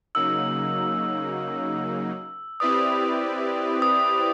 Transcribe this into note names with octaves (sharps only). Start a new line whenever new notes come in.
C#3 F#3 A#3 D#4 E6
C4 E4 G4 B4 D5 D#6
D#6